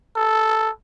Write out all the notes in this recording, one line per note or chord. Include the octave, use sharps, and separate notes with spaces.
A4